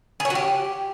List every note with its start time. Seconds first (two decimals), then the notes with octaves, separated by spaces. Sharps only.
0.20 G#4
0.25 C#5
0.30 F#4
0.35 G4